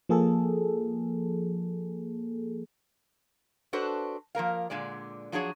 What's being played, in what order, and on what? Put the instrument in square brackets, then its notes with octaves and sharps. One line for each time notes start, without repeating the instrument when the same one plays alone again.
[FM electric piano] F3 A#3 G#4 A4
[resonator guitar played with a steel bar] D4 F#4 A4 B4 C5
F3 A#3 A#4 F5
A#2 D3 G#3 D5
F3 F#3 D4 G#4 C#5